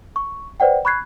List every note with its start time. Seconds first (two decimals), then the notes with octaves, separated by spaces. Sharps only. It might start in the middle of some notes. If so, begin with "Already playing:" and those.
0.16 C#6
0.60 B4 C5 D5 F#5 G5
0.85 B5 C#6 F#6 G#6 C7